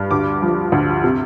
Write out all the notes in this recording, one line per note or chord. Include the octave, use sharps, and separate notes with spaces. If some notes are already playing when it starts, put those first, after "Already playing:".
Already playing: G2
D2 D6
F3
D2
C3